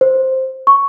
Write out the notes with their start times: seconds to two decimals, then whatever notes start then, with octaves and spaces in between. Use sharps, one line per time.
0.01 C5
0.67 C#6